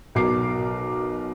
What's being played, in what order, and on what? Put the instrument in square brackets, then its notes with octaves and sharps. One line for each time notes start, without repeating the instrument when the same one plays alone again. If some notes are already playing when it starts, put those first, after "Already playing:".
[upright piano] B1 B2 A#4 D6 C7